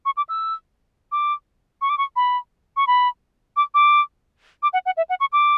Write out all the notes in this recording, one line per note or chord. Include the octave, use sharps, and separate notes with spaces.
C#6
D6
E6
D6
C#6
D6
C#6
B5
C#6
B5
D6
D6
D6
F#5
F#5
E5
F#5
C#6
D6